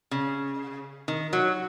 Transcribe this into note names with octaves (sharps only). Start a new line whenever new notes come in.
C#3
D#3
F#3